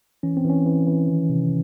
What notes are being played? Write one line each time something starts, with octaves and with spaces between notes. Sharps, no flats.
E3 C#4
C4
E3
C#4
E3
E3
D#3
C3